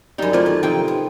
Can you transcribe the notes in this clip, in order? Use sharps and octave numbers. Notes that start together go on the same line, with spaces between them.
F#2 G3 D#4 B5
A3 C4 E4 F4 C5 D5
D#3
C3 F3 C4 D#4 G5
B3